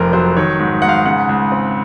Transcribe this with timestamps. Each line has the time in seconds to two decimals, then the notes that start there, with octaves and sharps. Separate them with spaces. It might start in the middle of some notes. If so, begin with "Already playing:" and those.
Already playing: F1 F2 A#4 C5
0.13 F#3 C5
0.37 D#3 C#5
0.59 G#2
0.82 G#2 F#5
0.89 F5
1.06 C#3 F#5
1.29 C#2
1.52 C4